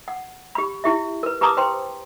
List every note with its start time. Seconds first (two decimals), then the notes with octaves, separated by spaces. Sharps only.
0.08 F#5
0.55 G4 B5
0.84 E4 G4 E5
1.23 A#4 B4
1.41 G4 B4 A5 A#5 D6 D#6
1.57 B4 C5 G5 C6